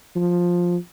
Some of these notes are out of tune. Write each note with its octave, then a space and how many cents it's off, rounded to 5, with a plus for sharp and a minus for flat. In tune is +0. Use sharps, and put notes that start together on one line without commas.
F3 +10